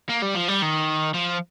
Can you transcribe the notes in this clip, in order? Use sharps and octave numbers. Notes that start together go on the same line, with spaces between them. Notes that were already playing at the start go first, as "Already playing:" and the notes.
A#3
G3
F3
G3
D#3
F3